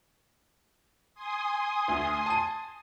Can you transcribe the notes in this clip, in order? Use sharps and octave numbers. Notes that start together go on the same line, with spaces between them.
G#5 C6 D#6
D2
A5 D#7